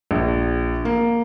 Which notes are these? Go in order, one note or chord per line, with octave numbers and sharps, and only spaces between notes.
A#1
A#3